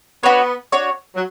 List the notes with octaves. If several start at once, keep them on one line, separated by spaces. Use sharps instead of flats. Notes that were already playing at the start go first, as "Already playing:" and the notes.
B3 D4 F#4 C#5
D4 F#4 C#5
F#3